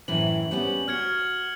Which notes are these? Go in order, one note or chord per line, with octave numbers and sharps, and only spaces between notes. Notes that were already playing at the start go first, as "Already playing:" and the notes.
F#2 A2 E3 F#7
G3 B3 C#4
F#4 F6 G#6 C#7